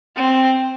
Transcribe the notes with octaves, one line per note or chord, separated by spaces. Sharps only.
C4